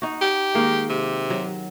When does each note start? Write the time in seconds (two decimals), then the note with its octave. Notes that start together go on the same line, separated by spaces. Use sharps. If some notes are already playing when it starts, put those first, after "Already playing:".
0.02 D#4 F#4
0.22 G4
0.55 D#3 G#3 A#3
0.90 C3
1.30 F#3